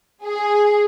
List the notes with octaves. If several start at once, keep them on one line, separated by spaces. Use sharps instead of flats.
G#4